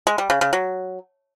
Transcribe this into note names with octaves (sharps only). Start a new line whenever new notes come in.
G#3
G3
C#3
C#3
F#3